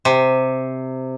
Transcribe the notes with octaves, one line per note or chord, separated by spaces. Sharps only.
C3